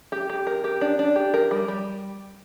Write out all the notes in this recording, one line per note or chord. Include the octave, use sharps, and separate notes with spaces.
G4
G4
A#4
G4
D4
D4
G4
A#4
G3
G3